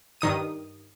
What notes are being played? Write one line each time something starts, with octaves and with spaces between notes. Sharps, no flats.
G2 D#3 D#6 D#7